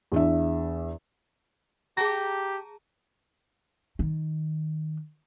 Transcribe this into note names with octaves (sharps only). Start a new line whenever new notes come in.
E2 D4 E5
G4 G#4 A5 A#5 A#6
D#3